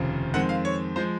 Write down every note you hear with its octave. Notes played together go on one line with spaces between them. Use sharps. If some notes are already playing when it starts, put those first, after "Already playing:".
Already playing: F1 D#2 C#3 F3 C4
F2 D#3 G#3 C4 F#5
F5
C#5
F3 G#3 C5